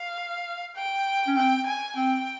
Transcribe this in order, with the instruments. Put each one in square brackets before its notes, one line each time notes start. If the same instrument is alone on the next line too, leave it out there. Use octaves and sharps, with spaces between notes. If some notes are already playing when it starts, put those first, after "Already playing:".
Already playing: [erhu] F5
G5
[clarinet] C#4
[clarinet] C4 [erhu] G5
[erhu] G#5
[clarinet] C4 [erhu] G5